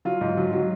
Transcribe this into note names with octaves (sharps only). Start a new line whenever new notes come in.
F#3 F4
G#2
F#3
F#3